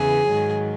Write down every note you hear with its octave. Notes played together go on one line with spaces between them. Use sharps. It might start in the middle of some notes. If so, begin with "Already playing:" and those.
Already playing: E2 C#3 E3 G#4
G#2 D#3 F#3